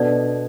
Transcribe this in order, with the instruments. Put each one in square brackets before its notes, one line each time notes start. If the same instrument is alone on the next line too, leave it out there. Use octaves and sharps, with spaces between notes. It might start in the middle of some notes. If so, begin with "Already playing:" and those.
Already playing: [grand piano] B2 B3 D4 A4 [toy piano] D5